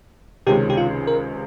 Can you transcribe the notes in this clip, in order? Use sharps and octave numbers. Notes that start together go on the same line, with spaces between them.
C#2 C3 D#3 G#3 C#4 G4
G4
F4
A#4